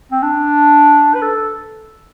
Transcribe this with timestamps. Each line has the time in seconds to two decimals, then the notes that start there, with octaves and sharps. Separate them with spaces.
0.12 C4
0.23 D4
1.14 B4
1.22 A4